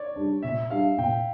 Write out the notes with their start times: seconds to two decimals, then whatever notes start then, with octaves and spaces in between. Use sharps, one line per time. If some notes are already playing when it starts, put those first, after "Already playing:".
Already playing: C#5 D5
0.16 G3 D4
0.43 A#2 E5
0.70 G3 D4 F5
0.98 A#2 G5